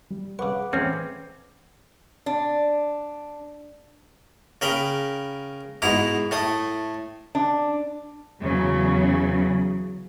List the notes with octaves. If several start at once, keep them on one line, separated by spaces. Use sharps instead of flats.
G3
C#3 B4 F#5 C#6 D6
E2 A2 C4 C#4
D4
C#3 A#4 G5 B5
G#2 B2 E4 A#5
A2 A3 D#6
D4
E2 C#3 F#3